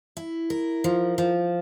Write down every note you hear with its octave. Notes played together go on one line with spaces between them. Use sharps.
E4
A#4
F3
F3